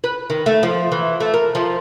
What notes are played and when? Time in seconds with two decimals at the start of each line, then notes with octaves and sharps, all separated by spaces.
0.04 B4
0.30 D#3
0.46 A3
0.63 F3
0.92 E3
1.20 A3
1.34 A#4
1.55 F3